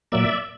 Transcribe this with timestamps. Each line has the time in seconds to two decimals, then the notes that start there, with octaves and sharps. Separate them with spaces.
0.12 A#2 F#3 A#3 D5 E5